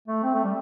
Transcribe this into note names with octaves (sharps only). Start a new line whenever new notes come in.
A3
C4
A3
G3